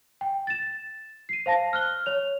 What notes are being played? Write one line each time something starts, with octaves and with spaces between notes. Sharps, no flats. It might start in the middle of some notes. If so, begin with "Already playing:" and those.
G5
A6 E7
C7 D#7
C5 F5 A5 A#6
F6 F#6 G7
C#5 F7